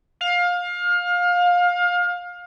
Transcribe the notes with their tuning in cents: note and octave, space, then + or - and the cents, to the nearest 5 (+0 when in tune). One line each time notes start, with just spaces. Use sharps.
F5 +25